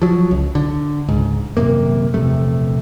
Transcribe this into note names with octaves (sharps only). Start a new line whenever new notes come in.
F3 F#3
C#2
D3
C#2 G#2
D#1 F#2 C3 A#3
A#1 E2 C3 A3